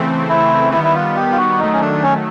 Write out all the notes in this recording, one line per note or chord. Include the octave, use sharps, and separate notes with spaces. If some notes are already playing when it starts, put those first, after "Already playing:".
Already playing: C#3 E3 A3 C4
E4
D#3 G3 B3 E4
E4
F4
G4
F4
F#4
D#3 F#3 A3 D#4
C#4
D4
C#4